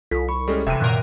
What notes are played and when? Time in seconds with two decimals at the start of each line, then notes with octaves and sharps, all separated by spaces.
0.11 C2 F4 A4 B6
0.28 B5 C#6
0.48 G3 G#3 C#4 A4
0.67 E1 C3 E3 E5 G5 D#7
0.80 F#2 A#2 D#3 A#4 F#6 C7